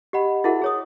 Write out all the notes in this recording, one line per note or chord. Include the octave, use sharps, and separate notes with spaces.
G4 D#5 F#5 B5
E4 F#4 G#4 A#4 E5 F#5
G#4 C#5 D#6